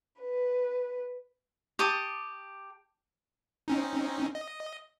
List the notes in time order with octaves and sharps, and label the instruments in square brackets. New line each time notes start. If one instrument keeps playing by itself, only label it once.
[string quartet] B4
[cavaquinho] G4 A5 C#6 D#6
[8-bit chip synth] C4 C#4 D#4
D#5